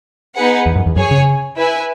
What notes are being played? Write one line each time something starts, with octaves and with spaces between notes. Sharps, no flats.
B3 D#4 G#4 B4 F#5
E2
F#2
E2
F#2 G#4 C#5 G#5
C#3
E4 B4 E5 G#5